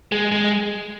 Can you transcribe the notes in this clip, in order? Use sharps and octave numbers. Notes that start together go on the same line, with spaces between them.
G#3
G#3